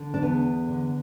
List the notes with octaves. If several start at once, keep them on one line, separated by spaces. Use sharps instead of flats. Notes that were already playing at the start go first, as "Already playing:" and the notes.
Already playing: D3
D4
E2 B3
D3